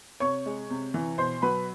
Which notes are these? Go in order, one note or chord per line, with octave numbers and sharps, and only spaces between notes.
C3 C#5 C#6
G#3
C3
E3
B2 C5 C6
F#3 B4 B5